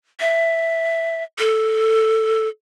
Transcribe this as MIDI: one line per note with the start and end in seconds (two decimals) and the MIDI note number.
0.20 1.23 76
1.39 2.48 69